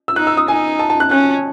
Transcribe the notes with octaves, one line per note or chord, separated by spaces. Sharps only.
E6
D#4 F#6
E6
D#6
D#4 G#5
A5
A5
F#6
C#4 F#6